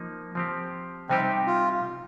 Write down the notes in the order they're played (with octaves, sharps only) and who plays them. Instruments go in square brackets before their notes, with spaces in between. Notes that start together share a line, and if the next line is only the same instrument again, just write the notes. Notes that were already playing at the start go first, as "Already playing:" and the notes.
Already playing: [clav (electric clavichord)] F3 A#3 D#4
F3 C4 G4
[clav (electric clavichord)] C3 G3 D#4 G4 [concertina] C4
[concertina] F4